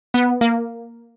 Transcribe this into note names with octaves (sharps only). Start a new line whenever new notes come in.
B3
A#3